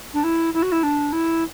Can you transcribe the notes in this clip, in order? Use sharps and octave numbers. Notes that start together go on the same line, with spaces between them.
D4
E4
E4
F#4
E4
D4
E4